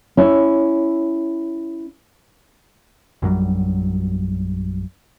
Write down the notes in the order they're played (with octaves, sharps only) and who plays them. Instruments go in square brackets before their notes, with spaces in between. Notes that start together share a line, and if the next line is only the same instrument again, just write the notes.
[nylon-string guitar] C#4 E4
[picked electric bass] A#1 F#2 F#3 G3